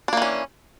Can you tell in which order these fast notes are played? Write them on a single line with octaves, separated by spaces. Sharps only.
D4 A#3 E3 C#4